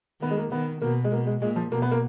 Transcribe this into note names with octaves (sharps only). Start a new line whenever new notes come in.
D#3 B3
G#3
A#3
D#3 B3
B2 A#3
G#3
B2 A#3
G#3
A#2 G#3
F3
B2 A#3
B3
A#3